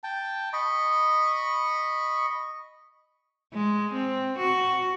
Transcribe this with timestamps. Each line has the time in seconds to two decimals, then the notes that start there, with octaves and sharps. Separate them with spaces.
0.03 G5 A5
0.53 D#5 B5 C#6
3.54 G#3
3.92 C4
4.38 F#4